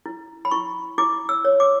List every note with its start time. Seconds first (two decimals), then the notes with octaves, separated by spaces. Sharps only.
0.06 E4
0.45 B5
0.51 E4 C#6
0.98 E4 D6
1.29 E6
1.45 C#5
1.60 D6